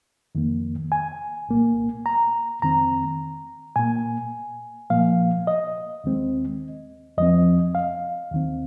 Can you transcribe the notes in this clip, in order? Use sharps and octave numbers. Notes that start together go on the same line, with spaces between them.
F2 D#3 A#3
G#5
C2 A#2 A#3
A#5
F2 D#3 C4 A#5
A#2 A#3 G#5
A#2 F3 A#3 F5
D#5
D#2 D#3 G#3 C4
F2 F3 C4 D#5
F5
D#2 D#3 C4